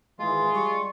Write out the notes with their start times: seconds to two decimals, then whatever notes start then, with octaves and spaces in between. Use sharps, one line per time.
0.20 G#1 E3 G#3 F4
0.54 G3 C#6